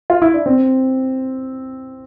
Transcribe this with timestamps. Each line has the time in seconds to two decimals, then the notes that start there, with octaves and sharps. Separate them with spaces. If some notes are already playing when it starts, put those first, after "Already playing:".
0.10 F4
0.22 E4
0.34 D4
0.46 C4